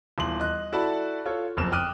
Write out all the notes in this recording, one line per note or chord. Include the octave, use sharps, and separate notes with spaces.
D#1 E2 C6 F#7
D#5 F#6
E4 F#4 A4 D5 A5 B5
F4 A4 C#5
F#1 F2 E7
G5 D6 D#6 F6 F#6 D#7